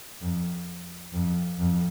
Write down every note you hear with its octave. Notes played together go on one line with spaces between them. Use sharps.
F2
F2
F2